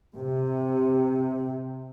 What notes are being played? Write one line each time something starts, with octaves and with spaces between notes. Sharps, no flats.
C3